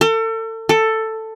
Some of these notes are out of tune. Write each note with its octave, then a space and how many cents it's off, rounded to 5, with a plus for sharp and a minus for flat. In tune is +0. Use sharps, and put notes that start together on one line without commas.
A4 +35
A4 +10